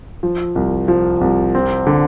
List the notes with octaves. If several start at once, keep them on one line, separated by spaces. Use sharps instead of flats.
F3
C2
F3
C2
C4
D3